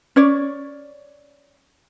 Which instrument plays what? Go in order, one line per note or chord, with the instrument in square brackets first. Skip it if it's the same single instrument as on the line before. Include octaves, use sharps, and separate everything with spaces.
[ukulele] C#4 C#5 D5